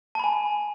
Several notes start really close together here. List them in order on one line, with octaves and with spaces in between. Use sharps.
A5 B5 G#5